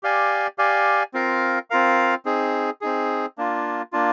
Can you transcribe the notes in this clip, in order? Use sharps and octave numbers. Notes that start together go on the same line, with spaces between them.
G4 D5 F5 G#5
G4 D5 F5 G#5
C4 F4 A#4 F5
C4 F4 A#4 F5
C4 D#4 G#4
C4 D#4 G#4
A#3 D4 F4
A#3 D4 F4